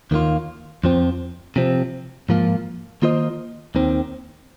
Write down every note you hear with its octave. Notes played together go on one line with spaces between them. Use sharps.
D#2 D#3 A#3 F4
F2 F3 C4
C3 F3 C4
G#2 F3 A#3 F4
D#3 A#3 F4 C5 D#5
D#2 D#3 C4